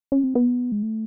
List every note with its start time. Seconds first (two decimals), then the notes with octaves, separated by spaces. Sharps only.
0.12 C#4
0.24 C4
0.35 B3
0.72 G#3
0.83 A3